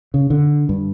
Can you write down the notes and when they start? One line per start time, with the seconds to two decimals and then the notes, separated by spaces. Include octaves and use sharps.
0.14 C#3
0.30 D3
0.69 G2